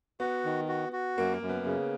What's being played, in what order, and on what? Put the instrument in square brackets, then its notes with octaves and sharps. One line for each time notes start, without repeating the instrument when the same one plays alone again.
[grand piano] B3 [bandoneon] F#4
[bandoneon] D#3
F#4
F#4
[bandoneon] F#2 [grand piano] A#3
[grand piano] A#3
[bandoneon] F#2
[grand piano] B3
[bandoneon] C#3